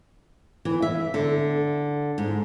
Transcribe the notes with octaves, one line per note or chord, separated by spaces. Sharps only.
E3
E5
D3
G#2